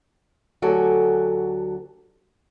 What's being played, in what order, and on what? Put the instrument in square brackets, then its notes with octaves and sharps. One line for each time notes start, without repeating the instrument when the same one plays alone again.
[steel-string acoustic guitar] D2 F#3 F#4 G4 A4 G#5